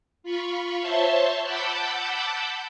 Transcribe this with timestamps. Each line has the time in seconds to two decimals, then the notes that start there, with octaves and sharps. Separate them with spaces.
0.23 F4 B5 C#6
0.81 C5 C#5 E5 A5 C6 C#6
1.44 F#5 A5 B5 D6 E6 G6